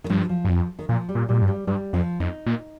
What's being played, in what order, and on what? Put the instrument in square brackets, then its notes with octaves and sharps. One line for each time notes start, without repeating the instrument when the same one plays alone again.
[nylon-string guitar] D#3
[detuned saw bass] G2 [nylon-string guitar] F3
[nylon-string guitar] F3
[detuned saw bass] G2
[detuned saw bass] F2 [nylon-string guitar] F3
[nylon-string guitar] D#3
[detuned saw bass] A#2 [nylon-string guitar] F3
[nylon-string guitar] G3
[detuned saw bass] A#2
[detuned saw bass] A#2 [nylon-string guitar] G3
[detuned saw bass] G2
[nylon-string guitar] G3
[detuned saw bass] G2 [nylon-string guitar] G3
[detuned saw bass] F2 [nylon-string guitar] F3
[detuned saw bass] F2 [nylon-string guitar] D#4
[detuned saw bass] A#2